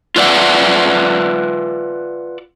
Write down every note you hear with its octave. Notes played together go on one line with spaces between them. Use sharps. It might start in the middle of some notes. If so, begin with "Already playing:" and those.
F4 B4 D5 E5 F#5